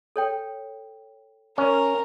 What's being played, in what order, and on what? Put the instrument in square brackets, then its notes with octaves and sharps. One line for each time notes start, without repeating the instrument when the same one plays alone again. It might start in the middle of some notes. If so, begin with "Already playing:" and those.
[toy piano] A4 C#5 G5
[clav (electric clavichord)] C#4 [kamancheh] A#4